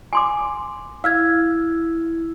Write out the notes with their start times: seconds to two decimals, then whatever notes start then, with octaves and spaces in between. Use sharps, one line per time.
0.13 G#5 C6 D6
1.04 E4 F5 E6 F6 G#6